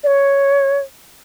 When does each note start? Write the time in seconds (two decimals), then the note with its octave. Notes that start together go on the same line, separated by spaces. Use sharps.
0.04 D5
0.07 C#5